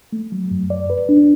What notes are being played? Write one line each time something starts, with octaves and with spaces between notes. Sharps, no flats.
A3
F#3
F#2
D5
B4
D4